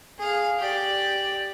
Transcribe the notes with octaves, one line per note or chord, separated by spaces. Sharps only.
G#4 F5
G4 D5